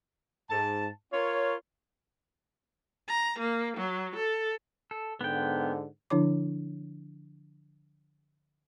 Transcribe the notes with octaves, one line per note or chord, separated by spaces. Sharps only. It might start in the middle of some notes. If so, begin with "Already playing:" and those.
G#2 A5
F4 A#4 C#5
A#5
A#3
F#3
A4
A4
G#2 D3 B3 G5
D3 F3 D4 E4 C#5 D6